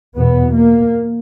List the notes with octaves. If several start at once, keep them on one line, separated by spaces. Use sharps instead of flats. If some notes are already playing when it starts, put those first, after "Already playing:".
E2 B2 B3
A#3